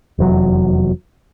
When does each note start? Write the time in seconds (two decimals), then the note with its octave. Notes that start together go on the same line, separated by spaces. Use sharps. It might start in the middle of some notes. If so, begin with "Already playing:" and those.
0.19 F1 E2 F#3